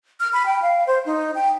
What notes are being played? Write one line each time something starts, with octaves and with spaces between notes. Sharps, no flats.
F6
B5
G5
F5
C5
D#4
G5